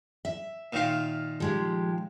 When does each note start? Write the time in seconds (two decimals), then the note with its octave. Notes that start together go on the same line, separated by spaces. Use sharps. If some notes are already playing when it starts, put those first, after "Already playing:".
0.25 E5
0.73 A#2 D#3 F4
1.40 F3 G#3 G4